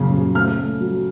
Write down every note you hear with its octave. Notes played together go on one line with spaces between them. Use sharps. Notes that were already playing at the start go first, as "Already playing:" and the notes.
Already playing: F#2 C#3 A#3
C#3
A3 F6
A3
F#3